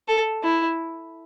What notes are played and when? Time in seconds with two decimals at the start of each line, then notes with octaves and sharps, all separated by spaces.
0.08 A4
0.43 E4